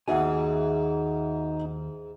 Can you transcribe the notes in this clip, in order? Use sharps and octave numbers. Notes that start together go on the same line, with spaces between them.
D#2 G#2 D#4 F#4 G#4 E5 F#5 G#5